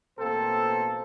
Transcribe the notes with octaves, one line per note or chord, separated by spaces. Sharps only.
A1 B2 A#3 C4 A4 C5